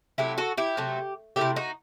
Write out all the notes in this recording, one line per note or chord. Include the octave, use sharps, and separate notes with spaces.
C3 F#3 A3 E4 G4
F#4 A4
E4 G4
C3 F#3 A3
C3 E3 A3 E4 G4
D#4 F#4